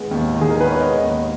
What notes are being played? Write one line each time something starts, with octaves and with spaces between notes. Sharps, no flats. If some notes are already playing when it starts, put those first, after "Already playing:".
Already playing: D#3 G#3 B3
D#2
D#3
G#4
A#4
B3 B4
C#5
G#3 D#5
D#2